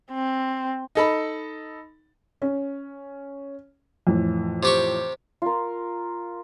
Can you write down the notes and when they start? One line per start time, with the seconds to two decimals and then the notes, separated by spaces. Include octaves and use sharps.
0.11 C4
0.95 D#4 A4 B5
2.42 C#4
4.07 F2 A2 E3
4.63 C3 G4 C#6
5.42 F4 A#4